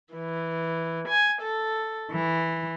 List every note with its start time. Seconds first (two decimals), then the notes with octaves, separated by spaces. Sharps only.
0.13 E3
1.08 G#5
1.41 A4
2.12 E3